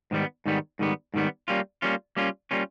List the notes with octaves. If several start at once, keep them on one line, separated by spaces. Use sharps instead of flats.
G#2 D#3 G3 B3
G#2 D#3 G3 B3
G#2 D#3 G3 B3
G#2 D#3 G3 B3
G3 A#3 C#4 F4
G3 A#3 C#4 F4
G3 A#3 C#4 F4
G3 A#3 C#4 F4